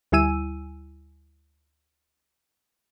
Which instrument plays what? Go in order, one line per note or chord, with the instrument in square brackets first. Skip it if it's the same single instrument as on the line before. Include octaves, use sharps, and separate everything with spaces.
[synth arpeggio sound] D2 G3 E4 G#5 E6 D#7